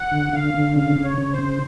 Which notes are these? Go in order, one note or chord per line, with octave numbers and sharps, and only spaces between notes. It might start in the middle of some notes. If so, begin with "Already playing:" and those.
Already playing: F#5
D3
D3 F5
D3
C#3 F5
C#3
C#5
C#3
C5
C#3